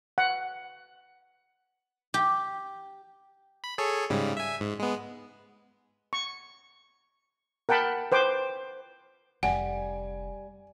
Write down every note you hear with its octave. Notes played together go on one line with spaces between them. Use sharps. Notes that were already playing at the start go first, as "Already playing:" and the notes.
F#5
G4
B5
G#4 A4 C#5
G#2 C#3 G3
E5 G#5
G#2
G#3 B3
C#6
A#4 F#5 G5 A5 B5
B4 C5 G5 D6
F1 G3 F#5 G#5